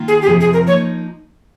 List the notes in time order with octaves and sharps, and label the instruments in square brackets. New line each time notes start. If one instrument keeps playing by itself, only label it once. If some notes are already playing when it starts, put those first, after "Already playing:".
Already playing: [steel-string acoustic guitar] D#3 A#3 F4
[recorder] G#4
G4
[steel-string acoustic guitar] F2 C3 F3 [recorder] G#4
[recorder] G#4
A#4
[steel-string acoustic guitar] F3 A#3 D#4 [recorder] C#5